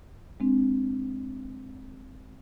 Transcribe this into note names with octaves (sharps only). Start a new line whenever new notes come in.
G#3 C4 D4